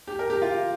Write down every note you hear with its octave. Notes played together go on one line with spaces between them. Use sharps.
G4
A#4
G4
F4